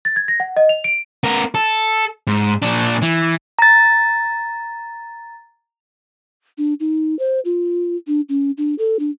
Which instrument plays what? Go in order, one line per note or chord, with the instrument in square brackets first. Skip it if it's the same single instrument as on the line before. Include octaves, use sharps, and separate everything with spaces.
[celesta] A6
G#6
A#6
F#5
D#5
F7
D7
[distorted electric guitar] B3 A#4
A4
G#2
A#2 D4
E3
[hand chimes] A#5 A6
[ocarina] D4
D#4
C5
F4
D4
C#4
D4
A4
D4